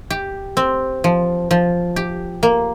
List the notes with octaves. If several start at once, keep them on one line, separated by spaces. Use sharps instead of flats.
G4
C4
F3
F3
G4
A#3